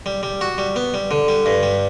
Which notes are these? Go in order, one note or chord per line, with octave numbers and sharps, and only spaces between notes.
G3
G3
F#4
G3
B3
G3
D3
G3
G2
G3